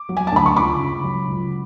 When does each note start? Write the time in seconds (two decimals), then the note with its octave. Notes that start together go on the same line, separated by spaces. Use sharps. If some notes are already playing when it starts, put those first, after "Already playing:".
Already playing: D6
0.09 F#3
0.17 G#5
0.27 A5
0.32 D2 B5
0.46 C#6
0.56 C#2 B5 D6
0.80 C#3
1.04 F#3
1.27 C#2